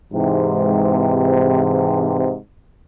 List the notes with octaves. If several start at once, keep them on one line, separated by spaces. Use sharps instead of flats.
G#2 C3 E3